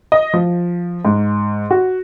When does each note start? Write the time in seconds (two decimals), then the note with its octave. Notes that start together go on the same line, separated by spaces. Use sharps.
0.12 D#5
0.34 F3
1.05 G#2
1.71 F#4